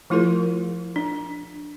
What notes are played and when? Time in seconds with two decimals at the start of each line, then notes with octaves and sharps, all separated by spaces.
0.10 F3 A3 E4 F4 G#4 A#4
0.96 D4